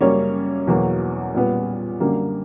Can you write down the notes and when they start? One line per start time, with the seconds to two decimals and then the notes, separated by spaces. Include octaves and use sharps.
0.01 F#2 C#3 G3 A#3 C#4 C#5
0.67 E2 B2 F#3 A#3
1.34 A#2 G3 B3
2.00 F#2 D3 G3 A#3